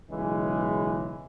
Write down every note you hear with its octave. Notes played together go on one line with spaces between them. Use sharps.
B1 C#3 E3 G#3